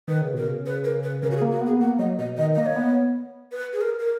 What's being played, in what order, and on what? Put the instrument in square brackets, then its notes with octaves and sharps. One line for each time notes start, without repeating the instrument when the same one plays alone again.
[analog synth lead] D#3 [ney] B4
[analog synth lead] C#3
[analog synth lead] B2 [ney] A#4
[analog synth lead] C#3
[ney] B4
A#4
B4
[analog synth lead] C#3 [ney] A#4
[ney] F#4
G#4
[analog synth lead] A#3
[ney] F#4
[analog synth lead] B3
[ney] G#4
[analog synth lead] A#3 [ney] F#5
[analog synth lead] F#3 [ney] D#5
[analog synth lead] B2 [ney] D#5
[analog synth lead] D#3 [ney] D#5
[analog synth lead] A#3 [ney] D#5
[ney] C#5
[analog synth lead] B3
[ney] B4
G#4
A#4
A#4